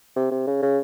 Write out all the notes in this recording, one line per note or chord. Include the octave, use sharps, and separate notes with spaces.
C3
C3
C#3
C#3